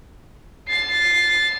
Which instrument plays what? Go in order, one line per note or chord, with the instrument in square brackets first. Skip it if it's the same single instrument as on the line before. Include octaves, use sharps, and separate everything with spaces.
[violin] A6 C7